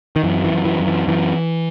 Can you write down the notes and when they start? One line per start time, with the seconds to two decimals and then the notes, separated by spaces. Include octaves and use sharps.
0.16 D#3
0.23 F#2 E3
0.44 E3
0.52 F#2
0.65 E3
0.80 F#2
0.87 E3
1.07 F#2 E3